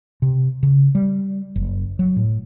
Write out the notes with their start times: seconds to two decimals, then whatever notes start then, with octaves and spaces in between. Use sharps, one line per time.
0.22 C3
0.63 C#3
0.95 G3
1.56 F#1
1.99 F#3
2.16 A2